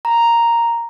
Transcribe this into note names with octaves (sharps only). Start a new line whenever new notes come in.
A#5